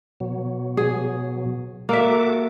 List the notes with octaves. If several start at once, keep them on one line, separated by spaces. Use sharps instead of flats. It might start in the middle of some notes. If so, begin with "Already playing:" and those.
B2 F#3
G#4
A#3 F#4 A4 E5 D6